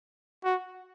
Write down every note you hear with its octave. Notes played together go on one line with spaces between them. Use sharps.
F#4